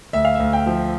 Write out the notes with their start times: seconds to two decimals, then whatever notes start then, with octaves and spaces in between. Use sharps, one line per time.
0.13 D2 E5
0.25 F5
0.35 D2 E5
0.53 G5
0.66 F3